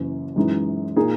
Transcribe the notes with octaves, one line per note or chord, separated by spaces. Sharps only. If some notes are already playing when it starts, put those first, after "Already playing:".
Already playing: F#1 F#2 E3
F#2 E3 G#3 D#4
A#2 A#3 D#4 G#4